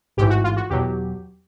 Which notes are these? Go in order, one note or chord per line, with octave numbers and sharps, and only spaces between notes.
A1 G#2 E3 G4
F#4
F4
F#4
E2 B2 F#3 G4